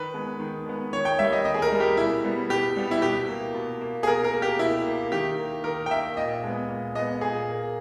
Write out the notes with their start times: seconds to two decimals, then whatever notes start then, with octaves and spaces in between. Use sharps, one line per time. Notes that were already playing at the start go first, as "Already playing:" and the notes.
Already playing: D#3 B4
0.14 G#3 B3
0.40 D#3
0.66 G#3 B3
0.93 D#3 C#5
1.05 G5
1.19 G3 A#3 E5
1.32 D#5
1.45 D#3 D#5
1.54 G#4
1.62 A#4
1.71 G3 A#3
1.80 G4
1.97 B2 E4
2.24 G3 B3
2.49 B2 G4
2.76 G3 B3
2.91 E4
3.02 B2 G4
3.28 A#3
3.55 B2
3.81 A#3
4.03 G#4
4.07 B2 A#4
4.24 A#4
4.33 A#3
4.42 G4
4.59 B2 E4
4.86 A#3
5.12 D#3 G4
5.38 A#3
5.64 D#3 A#4
5.86 G5
5.91 A#3 E5
6.17 A#2 D#5
6.43 G#3 B3
6.69 A#2
6.95 G#3 B3 D#5
7.21 A#2 G#4
7.49 A#3